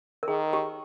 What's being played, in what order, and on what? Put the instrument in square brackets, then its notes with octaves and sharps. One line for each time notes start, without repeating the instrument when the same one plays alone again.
[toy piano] A#4
[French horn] D#3 [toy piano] G#4
[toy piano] G4